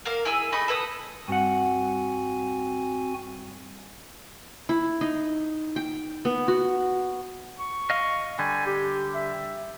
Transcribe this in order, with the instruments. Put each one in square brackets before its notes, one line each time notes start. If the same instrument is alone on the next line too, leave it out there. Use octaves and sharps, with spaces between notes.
[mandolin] A#3 A#4 F5
E4 G#4 G#5 E6
A3 D#5 B5 C#6
A4 B4 G5 D#6
[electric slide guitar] G2 F#5 [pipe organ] C4 F#4 G#5
[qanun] E4
D#4
G5
B3
F#4
[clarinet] C#6
[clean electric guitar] D#5 F5
[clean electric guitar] D3 G3 [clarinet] G#5
[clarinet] G4
E5